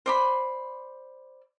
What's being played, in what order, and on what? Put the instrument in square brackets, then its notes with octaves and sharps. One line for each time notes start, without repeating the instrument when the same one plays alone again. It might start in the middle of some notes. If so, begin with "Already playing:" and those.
[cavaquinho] C5 D5 B5